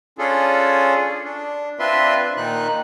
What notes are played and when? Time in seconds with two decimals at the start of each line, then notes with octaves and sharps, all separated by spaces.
0.18 C#4 D4 F4 G#4 A4
1.25 D4
1.79 C4 D4 F4 B4 E5 C6
2.37 A#2 D#3 D#4 F#6